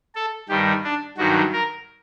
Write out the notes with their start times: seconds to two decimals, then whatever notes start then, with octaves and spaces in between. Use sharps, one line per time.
0.15 A4
0.49 G2 D#3 G3 G4
0.84 D4
1.17 G2 D#3 F#3 F#4
1.53 A#4